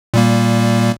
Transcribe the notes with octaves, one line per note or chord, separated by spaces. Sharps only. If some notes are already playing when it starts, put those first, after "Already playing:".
A#2 G3 A#3